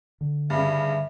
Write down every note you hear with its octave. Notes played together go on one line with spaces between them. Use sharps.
D3
G2 C#3 E5